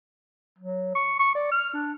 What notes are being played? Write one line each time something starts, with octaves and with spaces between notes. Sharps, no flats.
F#3
C#6
C#6
D5
F6
D4